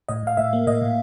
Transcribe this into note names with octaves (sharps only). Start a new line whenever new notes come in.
A2 D#5
A2 F5
A2 E5
A#3
A2 D#5
A2